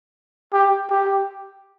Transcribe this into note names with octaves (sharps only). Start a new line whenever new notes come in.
G4
G4